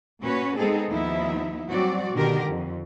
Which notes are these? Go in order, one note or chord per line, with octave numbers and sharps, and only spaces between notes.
A#2 C#4 F#4 B4 C#5
G#3 B3 C4 D#4 G#4 A4
D#2 F3 B3 D#4 E4 E5
F#3 G3 C4 F#4 D5
B2 D3 D#3 D4 G4 A#4
F2